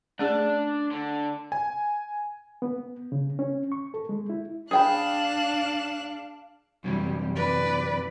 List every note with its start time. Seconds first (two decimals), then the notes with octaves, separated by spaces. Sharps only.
0.19 A3 C#4 D4 G#4
0.92 D3
1.52 G#5
2.62 B3
3.12 C#3
3.39 C#4
3.72 C#6
3.94 A4
4.09 G#3
4.30 E4
4.71 D4 G#4 F5 G5 B5 F#6 E7
6.84 F#2 C3 E3 G3
7.36 B4 D5